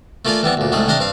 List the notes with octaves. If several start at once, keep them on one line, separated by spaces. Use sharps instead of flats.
A3 A#3 F4 D5 F5 G#5
E3 G3 B3 C4
D2 A#2
C2 G#2 A3 G#4
C2 D4 C5 D#5 F5
G2 C4 F5